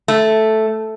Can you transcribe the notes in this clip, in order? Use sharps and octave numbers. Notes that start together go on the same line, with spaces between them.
A3